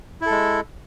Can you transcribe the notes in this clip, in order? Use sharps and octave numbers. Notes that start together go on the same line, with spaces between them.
G#3 E4 A4